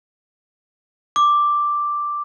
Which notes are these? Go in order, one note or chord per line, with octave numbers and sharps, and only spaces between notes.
D6